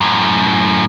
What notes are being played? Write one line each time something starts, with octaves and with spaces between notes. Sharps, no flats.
F#2 A2